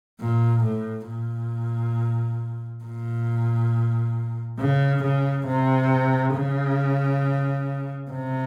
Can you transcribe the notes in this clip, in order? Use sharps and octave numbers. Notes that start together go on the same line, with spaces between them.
A#2
A2
A#2
A#2
C#3
C#3
C3
C#3
C3